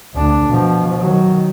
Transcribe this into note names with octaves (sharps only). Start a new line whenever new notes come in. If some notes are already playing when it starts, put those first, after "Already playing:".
D2 D4
B2 F3
D#3 F#3